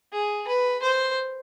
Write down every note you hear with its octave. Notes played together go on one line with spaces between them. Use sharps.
G#4
B4
C5